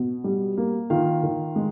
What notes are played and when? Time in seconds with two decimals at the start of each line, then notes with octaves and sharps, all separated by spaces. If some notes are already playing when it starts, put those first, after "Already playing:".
Already playing: B2
0.24 G3
0.57 A#3
0.90 D#3 F4 F5
1.23 D#3
1.56 G#3